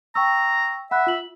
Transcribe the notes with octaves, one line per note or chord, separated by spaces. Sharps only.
G5 A#5 C#6 E6
E5 F#5 B5 F#6
F4 F#7